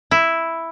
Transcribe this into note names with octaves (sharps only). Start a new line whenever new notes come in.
E4